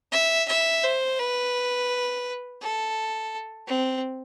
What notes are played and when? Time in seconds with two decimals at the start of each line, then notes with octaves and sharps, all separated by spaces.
0.12 E5
0.48 E5
0.84 C5
1.19 B4
2.61 A4
3.67 C4